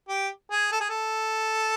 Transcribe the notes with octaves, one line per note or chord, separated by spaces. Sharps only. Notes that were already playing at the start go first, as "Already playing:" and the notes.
G4
G#4
A4
G#4
A4